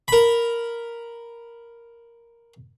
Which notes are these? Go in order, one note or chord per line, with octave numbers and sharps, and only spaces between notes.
A#4 B5